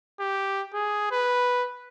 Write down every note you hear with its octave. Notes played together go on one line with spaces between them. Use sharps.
G4
G#4
B4